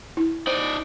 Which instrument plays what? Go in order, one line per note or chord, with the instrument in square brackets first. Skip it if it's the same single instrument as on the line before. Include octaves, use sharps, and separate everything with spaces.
[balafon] E4
[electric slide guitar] D#4 D5 [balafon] C5